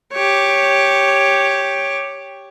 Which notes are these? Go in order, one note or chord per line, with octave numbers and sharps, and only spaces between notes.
G4 C#5